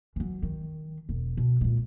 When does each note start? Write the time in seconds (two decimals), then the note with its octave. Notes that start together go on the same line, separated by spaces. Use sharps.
0.16 E3 F#3
0.42 D#3
1.09 E1
1.37 B2
1.61 A#2 G#3